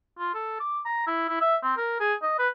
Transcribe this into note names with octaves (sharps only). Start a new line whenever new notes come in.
F4
A4
D6
A#5
E4
E4
E5
C4
A#4
G#4
D#5
B4